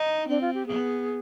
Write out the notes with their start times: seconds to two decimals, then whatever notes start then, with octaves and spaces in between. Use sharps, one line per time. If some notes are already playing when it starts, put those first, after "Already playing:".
Already playing: D#4
0.28 C4 D4
0.41 F4
0.54 G4
0.66 B3 G#4